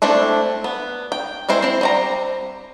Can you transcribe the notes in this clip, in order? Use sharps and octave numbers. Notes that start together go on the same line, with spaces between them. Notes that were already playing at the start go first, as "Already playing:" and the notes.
A3 C4 D4 E4
B3
G5
G#3 C4 E4 C5
C4 E4
G3 C4 A#5